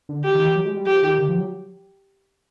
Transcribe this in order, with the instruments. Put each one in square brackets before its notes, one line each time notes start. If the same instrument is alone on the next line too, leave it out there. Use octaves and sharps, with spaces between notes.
[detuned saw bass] D3
[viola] G4
[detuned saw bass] D#3
E3
F#3
G#3
G3
[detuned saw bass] F3 [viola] G4
[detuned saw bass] D#3
D3
F3
F#3